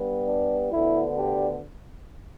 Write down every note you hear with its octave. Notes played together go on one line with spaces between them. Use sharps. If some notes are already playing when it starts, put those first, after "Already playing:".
Already playing: G2 G3 B3
D4
D2 D3 B3 E4
D4 G4